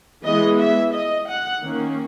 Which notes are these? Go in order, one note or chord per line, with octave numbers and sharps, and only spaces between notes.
E3 G#3 B3 D#5
E5
D#5
F#5
D#3 A#3 C#4